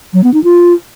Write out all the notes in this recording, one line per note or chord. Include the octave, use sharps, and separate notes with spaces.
F#3
B3
D#4
F4